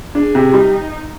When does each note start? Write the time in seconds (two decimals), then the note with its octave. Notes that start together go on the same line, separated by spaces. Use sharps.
0.15 D4 G#4
0.35 C3
0.54 G3 D#4